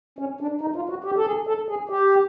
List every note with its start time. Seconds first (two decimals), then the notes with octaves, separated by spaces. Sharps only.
0.19 C#4
0.41 D4
0.61 D#4
0.76 F4
0.90 F#4
1.04 G4
1.16 A4
1.26 G#4
1.47 A4
1.69 G#4
1.89 G4